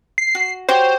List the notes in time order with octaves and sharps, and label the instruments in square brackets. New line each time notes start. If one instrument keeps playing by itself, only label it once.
[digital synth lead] C7
[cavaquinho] F#4
[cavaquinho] F#4 G4 C#5 [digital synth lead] C5